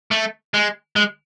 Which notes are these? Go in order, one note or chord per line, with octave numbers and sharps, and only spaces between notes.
A3
G#3
G#3